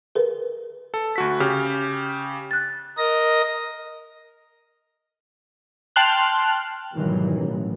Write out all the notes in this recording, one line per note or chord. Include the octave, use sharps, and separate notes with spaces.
G#4 A#4 B4
A4
D2 F#4 B6
C#3 G4 F6
F#6 A6
A#4 D#5 A#6
G5 A5 C6 F6 F#6
G#2 B2 D#3 E3 F#3 G3
A1